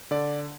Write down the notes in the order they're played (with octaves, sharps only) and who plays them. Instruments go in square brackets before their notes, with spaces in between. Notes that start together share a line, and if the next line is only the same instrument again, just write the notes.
[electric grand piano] D3 D5